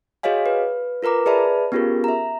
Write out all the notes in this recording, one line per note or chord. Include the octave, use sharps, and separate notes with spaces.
F#4 G#4 C#5 D#5 F5 G#5
B4
F4 A#4 B4 A#5 D6
G#4 B4 D5 E5 A5 B5
B3 C#4 F4 G4 G#4 A#4
E5 A#5